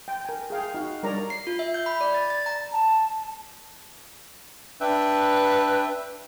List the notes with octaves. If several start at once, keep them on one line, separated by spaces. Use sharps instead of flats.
G5
A#4 G#5
G#4 F5 G5
D#4 F#4 F5
G3 D4 A#4 C#5 D5 A#5
C7
F4
E5
G6
B5
D5
A6
A6
A#5
A5
D4 B4 E5 G5